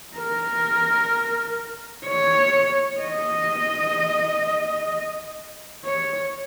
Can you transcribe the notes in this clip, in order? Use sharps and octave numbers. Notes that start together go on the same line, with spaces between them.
A#4
C#5
D#5
C#5